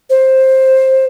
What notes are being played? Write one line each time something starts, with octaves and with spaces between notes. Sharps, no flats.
C5